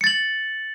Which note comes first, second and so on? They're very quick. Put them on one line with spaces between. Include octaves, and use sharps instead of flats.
C#7 A6 F#7